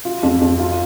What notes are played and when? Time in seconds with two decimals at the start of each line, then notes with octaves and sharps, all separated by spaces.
0.05 F4
0.23 F2
0.41 F2
0.59 F4